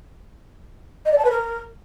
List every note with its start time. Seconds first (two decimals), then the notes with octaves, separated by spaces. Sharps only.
1.05 D#5
1.11 D5
1.18 A5
1.24 B4
1.30 A#4